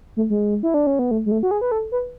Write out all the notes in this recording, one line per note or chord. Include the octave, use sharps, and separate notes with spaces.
A3
G#3
E4
D4
C#4
B3
A3
G#3
A3
F#4
G#4
B4
A4
B4